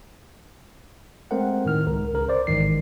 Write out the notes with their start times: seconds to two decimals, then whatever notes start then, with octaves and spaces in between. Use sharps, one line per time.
1.31 G#3 A3 C4 A#4 C5 F#5
1.65 A2 D#3 F6
1.87 C#2 A#4
2.13 C#2 C#3 A#4
2.29 C5 D5
2.47 A1 G#2 D#3 C7